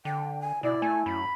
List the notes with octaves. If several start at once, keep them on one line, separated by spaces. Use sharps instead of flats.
D3 G5
G#5
B2 E4 D5
A3 G#5
F#2 B5